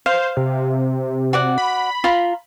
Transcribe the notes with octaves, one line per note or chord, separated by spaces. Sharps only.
C5 F5
C3
F#4 D5 F#5
B5
F4 A#5